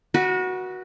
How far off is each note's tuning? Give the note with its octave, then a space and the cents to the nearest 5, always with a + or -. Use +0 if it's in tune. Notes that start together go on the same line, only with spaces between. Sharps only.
F#4 +0 B4 -40 D#5 +45